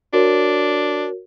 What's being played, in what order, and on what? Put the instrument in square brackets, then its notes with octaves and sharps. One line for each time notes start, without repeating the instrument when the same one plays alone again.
[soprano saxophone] D4 [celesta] F#4 A#4 C#5